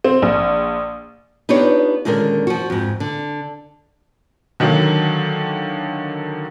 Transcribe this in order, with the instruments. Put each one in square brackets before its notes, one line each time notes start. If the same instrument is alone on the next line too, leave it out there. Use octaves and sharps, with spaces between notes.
[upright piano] C4
A#1
[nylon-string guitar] B3 D4 D#4 F4 G4 C#5
A#2 D3 D#3 G#3 C#4 A#4
F3 F#4
F2 G#2
D3
[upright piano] D3 D#3 F#3 A#3